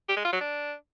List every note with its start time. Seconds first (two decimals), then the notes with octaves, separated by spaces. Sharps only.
0.09 G4
0.16 G#3
0.24 F4
0.32 F#3
0.40 D4